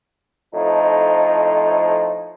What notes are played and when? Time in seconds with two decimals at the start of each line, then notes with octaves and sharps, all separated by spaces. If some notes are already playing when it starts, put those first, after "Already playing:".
0.54 F2 A2 F3 D#4